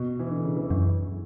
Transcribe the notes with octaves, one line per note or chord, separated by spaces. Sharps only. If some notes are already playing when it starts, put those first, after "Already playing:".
Already playing: B2
E3
D3
C#3
E3
F#2